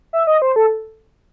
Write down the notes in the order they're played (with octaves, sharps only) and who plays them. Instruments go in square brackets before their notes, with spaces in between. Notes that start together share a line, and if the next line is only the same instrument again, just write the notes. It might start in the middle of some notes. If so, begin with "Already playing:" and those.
[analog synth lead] E5
D#5
C5
A4